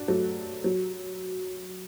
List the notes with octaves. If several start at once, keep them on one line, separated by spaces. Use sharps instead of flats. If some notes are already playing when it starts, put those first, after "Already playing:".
Already playing: D4 F#4
F#3 A3
F#3